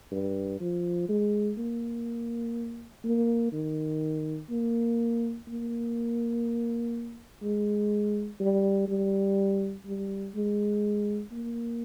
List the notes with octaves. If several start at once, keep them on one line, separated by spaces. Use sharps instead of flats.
G2
F3
G#3
A#3
A#3
D#3
A#3
A#3
G#3
G3
G3
G3
G#3
A#3